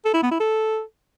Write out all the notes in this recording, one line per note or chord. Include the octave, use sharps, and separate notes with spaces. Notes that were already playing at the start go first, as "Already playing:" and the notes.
A4
E4
B3
E4
A4